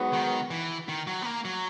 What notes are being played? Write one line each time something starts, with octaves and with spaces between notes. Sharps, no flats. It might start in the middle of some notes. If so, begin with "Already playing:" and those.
Already playing: G#2 F#3 B3
D#3
E3
D#3
F#3
B3
A#3
F#3